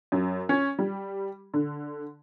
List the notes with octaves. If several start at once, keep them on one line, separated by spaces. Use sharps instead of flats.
F#2
C#4
G3
D3